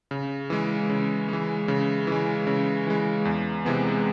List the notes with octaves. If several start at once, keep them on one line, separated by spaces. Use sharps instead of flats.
C#3
E3 G#3
C#3
E3 G#3
C#3
E3 G#3
C#3
E3 G#3
E2
C3 E3 G#3 B3